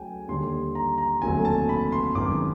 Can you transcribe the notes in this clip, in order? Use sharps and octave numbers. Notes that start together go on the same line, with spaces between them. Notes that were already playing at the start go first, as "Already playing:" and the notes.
Already playing: C#2 C#3 F#3 A3 C#4 G5 G#5
D#2 D3 G3 C6
A#5
A#5
F1 D#2 D3 F#3 A3 G#5
A5
B5
C6
G1 F#2 D#3 G#3 D6